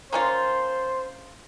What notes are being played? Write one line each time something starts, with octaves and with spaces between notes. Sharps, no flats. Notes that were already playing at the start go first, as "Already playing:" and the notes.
A#3 C#4 F4 C5